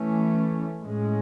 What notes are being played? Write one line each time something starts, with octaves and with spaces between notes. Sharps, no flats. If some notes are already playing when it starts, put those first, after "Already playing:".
Already playing: E3 A3 C#4
A2 G#3 C#4